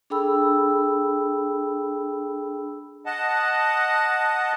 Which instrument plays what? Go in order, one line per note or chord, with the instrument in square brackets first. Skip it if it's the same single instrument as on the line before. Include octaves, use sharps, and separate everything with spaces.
[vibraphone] D4 G#4 A4 G5 B5 E6
[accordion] D#5 F#5 A5